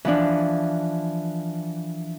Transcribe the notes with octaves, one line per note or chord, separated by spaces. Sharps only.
E3 F3 D4